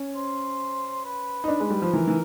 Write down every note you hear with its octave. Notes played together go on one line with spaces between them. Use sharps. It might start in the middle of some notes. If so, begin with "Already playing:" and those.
Already playing: C#4
C5
B4
D#4
D4
G#3
G3
F3
E3 A#4
E3